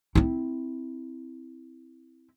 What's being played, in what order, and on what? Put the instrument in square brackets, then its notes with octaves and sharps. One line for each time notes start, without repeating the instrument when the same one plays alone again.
[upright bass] C4 E4